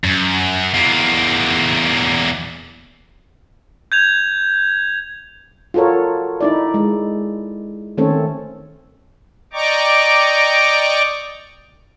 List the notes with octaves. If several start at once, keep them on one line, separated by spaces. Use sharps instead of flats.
F#2
E2 A#3
G6 G#6 F7
F4 F#4 A4 A#4 C#5
D#4 E4 D5
G#3
D#3 A3 C4 C#4 A4 C#5
D5 D#5 G5 A#5 C#6 D6